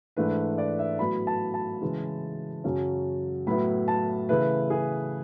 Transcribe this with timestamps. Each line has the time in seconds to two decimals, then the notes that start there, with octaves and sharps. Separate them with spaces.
0.17 G#2 E3 A3 D4 B4
0.58 D5
0.79 E5
0.99 A2 F#3 B3 B5
1.27 A5
1.54 A5
1.81 C#3 E3 G#3 C#4 E4
2.64 F#2 C#3 F#3 C#4
3.47 A2 F#3 B3 E4 B5
3.88 A5
4.29 C#3 E3 A3 E4 B4
4.70 G#4